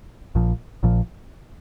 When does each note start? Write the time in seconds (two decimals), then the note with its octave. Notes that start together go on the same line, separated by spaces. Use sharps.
0.35 A#1 A#2 F3
0.83 A#1 A#2 F3